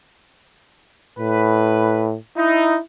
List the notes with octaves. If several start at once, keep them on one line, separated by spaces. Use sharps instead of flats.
A2 B4
D#4 E4